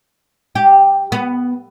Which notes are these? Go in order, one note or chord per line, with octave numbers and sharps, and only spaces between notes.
G4
B3